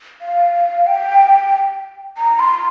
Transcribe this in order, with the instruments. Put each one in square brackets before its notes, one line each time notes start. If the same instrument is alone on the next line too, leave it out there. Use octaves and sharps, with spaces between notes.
[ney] F5
G5
A#5
C6